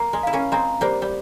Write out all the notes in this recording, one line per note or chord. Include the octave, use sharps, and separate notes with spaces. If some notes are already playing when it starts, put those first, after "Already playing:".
Already playing: A#3 A#5
G#3
E4 F5
A#3 C#4
G#3 C4 A#5
G3 A#3 C5
G3